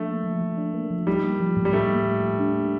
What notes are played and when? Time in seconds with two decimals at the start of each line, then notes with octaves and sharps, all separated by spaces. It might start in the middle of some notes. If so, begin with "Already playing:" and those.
Already playing: F3 A3 D4
0.08 A#3
0.24 F3
0.41 F3
0.57 D4
0.74 A#3
0.91 F3
1.07 G3 D#4
1.24 A#3
1.40 F3
1.57 A2
1.65 G3
1.73 A3 D#4
1.89 A#3
2.06 F3
2.22 A2
2.40 D4
2.56 A#3